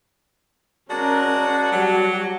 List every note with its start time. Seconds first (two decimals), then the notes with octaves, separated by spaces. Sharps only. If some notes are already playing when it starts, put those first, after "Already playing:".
0.90 G#3 C#4 F#4 A#4 D5 A5
1.72 F#3 G3 F#4